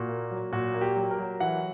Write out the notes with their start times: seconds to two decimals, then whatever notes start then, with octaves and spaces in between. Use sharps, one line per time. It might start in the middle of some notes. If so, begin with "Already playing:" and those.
Already playing: A#2 F#4
0.09 A#3
0.31 F#3
0.52 A#2 F#4
0.74 A#3
0.81 G4
0.96 F#3
1.11 A#4
1.19 F#3
1.40 E3 F#5